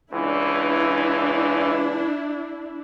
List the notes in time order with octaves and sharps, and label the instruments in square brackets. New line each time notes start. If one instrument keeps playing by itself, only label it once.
[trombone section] C#2 E3 [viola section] D4 E4